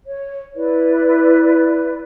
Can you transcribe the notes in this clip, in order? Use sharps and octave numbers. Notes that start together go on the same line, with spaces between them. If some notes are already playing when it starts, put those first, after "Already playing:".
C#5
E4 B4 D5